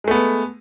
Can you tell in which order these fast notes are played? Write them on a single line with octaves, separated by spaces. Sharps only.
G#3 A3 B3